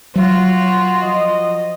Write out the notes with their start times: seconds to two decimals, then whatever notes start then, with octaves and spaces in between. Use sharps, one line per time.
0.16 F#3 F4 F#4
1.03 F3 D#5